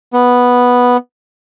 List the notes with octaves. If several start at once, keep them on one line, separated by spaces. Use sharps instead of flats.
B3